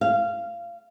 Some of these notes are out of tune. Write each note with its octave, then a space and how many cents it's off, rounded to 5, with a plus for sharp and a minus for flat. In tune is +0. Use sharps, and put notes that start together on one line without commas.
F5 -20